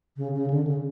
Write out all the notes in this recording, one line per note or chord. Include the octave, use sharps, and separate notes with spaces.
C#3
C#3
D3
C#3